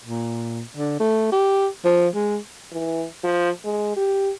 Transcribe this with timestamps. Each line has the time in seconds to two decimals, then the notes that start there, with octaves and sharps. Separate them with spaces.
0.04 A#2
0.77 D3
1.00 A3
1.32 G4
1.85 F3
2.15 G#3
2.72 E3
3.23 F3
3.65 G#3
3.96 G4